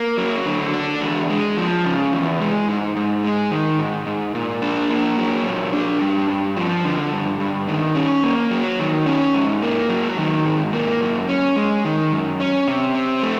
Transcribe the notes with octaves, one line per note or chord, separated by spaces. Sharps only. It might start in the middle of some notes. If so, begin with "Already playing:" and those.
Already playing: A#3
F#3
D3
D4
E2
G#3
F3
C#3
E2
G#3
G#2
G#2
G#3
D#3
G#2
G#2
A#2
D4
A#3
F#3
A#2
D4
G2
G2
F3
D3
G2
G2
D#3
C#4
A#3
F#3
D#3
C#4
G#2
A#3
F#3
D#3
G#2
A#3
F#2
C#4
G#3
D#3
F#2
C#4
C3
C4
A3